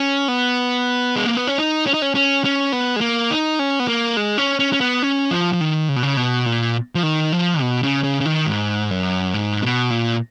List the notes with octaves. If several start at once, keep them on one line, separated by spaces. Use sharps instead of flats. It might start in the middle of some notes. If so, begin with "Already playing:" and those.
Already playing: C#4
B3
G#3
A#3
B3
C#4
D#4
C#4
D#4
C#4
C#4
C#4
B3
G#3
A#3
D#4
C#4
B3
A#3
G#3
C#4
C#4
C#4
B3
C#4
F3
F3
D#3
C#3
B2
C#3
B2
A#2
F3
D#3
F3
B2
C#3
C#3
C#3
D#3
G#2
F#2
G#2
B2
A#2